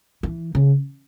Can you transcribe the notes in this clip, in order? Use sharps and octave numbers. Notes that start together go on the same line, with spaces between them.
E3
C#3